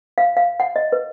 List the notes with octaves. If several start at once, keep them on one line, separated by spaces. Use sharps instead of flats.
F5
F5
F#5
D#5
B4